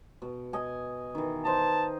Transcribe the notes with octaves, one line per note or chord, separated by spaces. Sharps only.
B2
D#5 G#5
D#3 E3
C5 D#5 A5